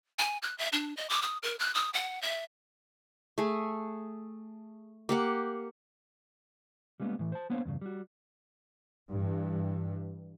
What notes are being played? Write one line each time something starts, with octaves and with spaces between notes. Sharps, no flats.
G#5
F#6
E5
D4
D#5
D6
D#6
A#4
F#6
D#6
F#5
E5
A3 G#4
A#3 G4 F#5
G3 G#3 A#3 B3 C#4
A2 E3
C5 A5
A#3 B3 D4 C5 C#5 F5
E2 G2 C#3
G3 F#4
G2 E3